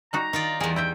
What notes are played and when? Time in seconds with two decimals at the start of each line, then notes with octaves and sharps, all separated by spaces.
0.13 G3 D#4 F#4 A#5
0.33 D#3 D#4 F4 D5
0.60 E2 G3 G#4 A#4
0.76 E4 D#5 E5 G5